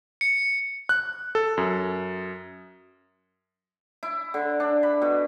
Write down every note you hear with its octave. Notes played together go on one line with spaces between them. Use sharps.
C#7
F#6
A4
F#2
E4
D3
D4
B5
B2